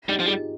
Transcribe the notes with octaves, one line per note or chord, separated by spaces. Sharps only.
G3 D#4 G4
F3
G3 F4 G#4